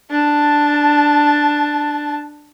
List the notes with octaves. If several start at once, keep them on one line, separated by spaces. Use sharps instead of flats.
D4 A5